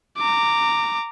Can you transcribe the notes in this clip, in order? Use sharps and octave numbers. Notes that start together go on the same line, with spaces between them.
A#5 D6